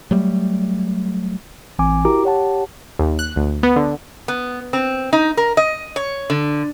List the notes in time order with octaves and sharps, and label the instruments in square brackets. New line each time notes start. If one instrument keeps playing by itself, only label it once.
[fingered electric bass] F#3 G3 A3
[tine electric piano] A1 E3 C4 G#5 D6
E4 F#4 G4 A#4 A#5 D6
G4 C#5 F#5 A5
[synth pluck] D#2
F#6
D2
B3
D3
[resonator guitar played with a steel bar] B3
C4
D#4
A#4
D#5
C#5
D3